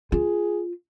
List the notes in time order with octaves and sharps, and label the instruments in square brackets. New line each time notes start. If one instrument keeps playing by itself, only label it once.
[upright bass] F4 [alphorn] G#4